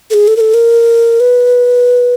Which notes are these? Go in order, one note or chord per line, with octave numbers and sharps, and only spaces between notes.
A4
G#4
A4
A#4
A4
A#4
B4